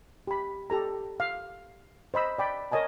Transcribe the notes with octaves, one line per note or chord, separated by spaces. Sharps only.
G4 B5
G4 A4 A#5
F5
C5 D#5 B5 E6
D5 G5 B5
A#4 C#5 D#5 G#5 A5